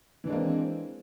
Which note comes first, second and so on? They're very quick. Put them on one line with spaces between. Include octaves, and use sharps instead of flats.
E3 D4 G#3 A#3 C4